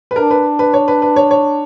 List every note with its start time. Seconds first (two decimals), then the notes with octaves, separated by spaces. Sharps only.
0.11 B4
0.16 D4 A#4
0.31 B4
0.59 B4
0.74 C#5
0.88 B4
1.02 B4
1.16 C#5
1.31 C#5